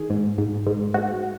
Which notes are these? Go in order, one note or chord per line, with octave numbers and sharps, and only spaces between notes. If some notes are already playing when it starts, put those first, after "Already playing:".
Already playing: D#3 G#4
G#2
G#2
G#2
G#2 F#4